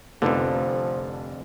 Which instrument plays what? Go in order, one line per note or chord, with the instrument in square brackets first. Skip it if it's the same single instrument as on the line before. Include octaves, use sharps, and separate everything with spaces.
[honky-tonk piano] F1 [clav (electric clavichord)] F2 D3 [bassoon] F3 [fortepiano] A3 B3 D#4